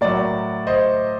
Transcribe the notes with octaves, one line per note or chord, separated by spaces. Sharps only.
A2 F#3 A#4 D5
C5 D#5